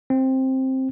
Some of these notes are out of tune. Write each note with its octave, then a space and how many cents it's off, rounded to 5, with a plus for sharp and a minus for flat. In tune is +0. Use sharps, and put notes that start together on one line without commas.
C4 +10